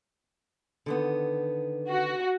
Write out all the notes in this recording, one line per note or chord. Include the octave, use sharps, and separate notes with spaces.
D3 D#3 B3
F#4